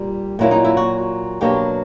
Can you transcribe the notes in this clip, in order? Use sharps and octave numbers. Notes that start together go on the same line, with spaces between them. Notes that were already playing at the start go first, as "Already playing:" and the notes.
Already playing: A#2 G3
A#2 F#3 A#3 E4
D#4
E4
F#4
B2 F#3 A#3 D4 G4